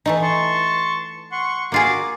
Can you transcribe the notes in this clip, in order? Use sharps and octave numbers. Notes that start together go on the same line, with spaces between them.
E3 A3 D#4
A5 C6 C#6
F#5 C6 C#6
A#3 F4 F#4 G#4 D6